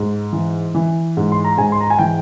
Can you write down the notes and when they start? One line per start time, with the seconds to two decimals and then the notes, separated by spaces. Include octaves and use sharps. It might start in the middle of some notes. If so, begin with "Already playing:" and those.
Already playing: G#2
0.33 E3
0.75 E3
1.17 G#2
1.32 C6
1.44 A#5
1.58 G#2 G#5
1.72 C6
1.80 A#5
1.90 G#5
1.99 E3 G5